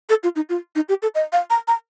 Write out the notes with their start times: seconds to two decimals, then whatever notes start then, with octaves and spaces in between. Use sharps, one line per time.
0.09 A4
0.23 F4
0.36 D#4
0.49 F4
0.76 D#4
0.89 G4
1.02 A4
1.15 D#5
1.33 F5
1.50 A#5
1.68 A#5